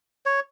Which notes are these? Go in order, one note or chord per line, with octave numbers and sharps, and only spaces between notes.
C#5